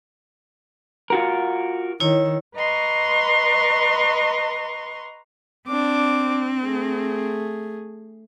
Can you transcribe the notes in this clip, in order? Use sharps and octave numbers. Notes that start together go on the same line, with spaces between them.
F4 F#4 A#4
D#3 E4 C#5
B4 D#5 A#5 C6 C#6
C4 D4 D6
A3 G#4